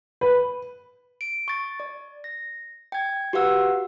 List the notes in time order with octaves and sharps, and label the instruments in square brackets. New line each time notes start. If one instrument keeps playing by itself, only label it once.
[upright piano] B4
[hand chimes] D7
C#6 A6
D5
A#6
G5 G#6
F#4 G4 B4 F5 F#5 E6